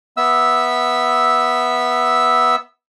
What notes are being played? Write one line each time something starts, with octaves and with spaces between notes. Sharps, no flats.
B3 E5 E6